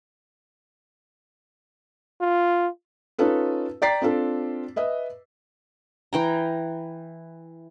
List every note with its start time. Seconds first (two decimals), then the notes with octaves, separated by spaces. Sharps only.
2.21 F4
3.19 C#4 D#4 F4 A4 B4
3.82 D5 G5 A#5 A6 B6 C7
4.02 C4 D4 F4 A4
4.76 B4 D#5 E5
6.13 E3 G5 A#5